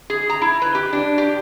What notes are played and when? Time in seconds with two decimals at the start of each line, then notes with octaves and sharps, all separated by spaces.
0.10 G#4
0.30 A#5
0.42 E4
0.62 B4
0.75 G4
0.93 D4
1.18 G4